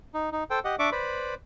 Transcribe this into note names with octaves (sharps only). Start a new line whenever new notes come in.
D#4
D#4
A4 C5 G5
G4 D#5 F#5
D4 D5 E5 C#6 D6
B4 C5 D5 B5